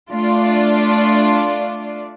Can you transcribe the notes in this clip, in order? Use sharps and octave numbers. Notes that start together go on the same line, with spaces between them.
A3 D4 F4 D5